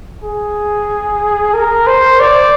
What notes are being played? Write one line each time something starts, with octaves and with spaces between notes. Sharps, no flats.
G#4
A#4
C5
D5